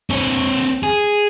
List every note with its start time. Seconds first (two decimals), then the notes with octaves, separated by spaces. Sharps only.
0.10 C4 C#5
0.83 G#4